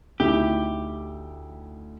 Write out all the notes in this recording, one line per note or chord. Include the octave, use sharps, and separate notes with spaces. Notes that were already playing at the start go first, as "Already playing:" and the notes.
D2 D#4 E4 G4